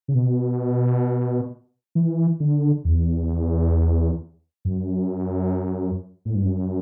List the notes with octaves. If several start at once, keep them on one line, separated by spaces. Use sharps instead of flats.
C#3
B2
E3
D3
E2
F#2
A2
G2
F#2